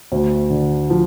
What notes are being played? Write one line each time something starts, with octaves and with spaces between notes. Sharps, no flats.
D2
D3
F3